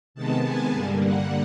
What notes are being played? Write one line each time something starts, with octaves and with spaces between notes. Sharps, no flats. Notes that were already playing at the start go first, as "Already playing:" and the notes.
C3 D#3 G#3 B3 A5
G#5
G2 D3 G3 A#3
F#5